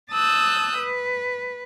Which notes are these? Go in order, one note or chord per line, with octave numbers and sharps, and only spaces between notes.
A5 D#6 E6 F#6 G6
B4